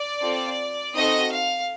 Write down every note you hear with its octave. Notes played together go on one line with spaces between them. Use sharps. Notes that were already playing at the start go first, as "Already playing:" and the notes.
Already playing: D5
C4 F4 A4
C4 D#4 F#4 A4 D#5
F5